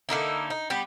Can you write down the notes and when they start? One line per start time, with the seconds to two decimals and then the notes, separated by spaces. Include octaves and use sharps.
0.09 D3 A#3 D#4 E4
0.50 D#4
0.70 G3 B3 G4